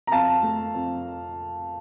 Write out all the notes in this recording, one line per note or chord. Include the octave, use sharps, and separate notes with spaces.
A#5
F2 F5 A5
A3
F2